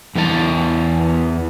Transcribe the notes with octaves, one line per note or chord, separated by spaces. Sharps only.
E2 E3 F4 A5